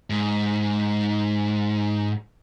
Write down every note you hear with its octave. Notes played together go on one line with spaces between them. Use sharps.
G#2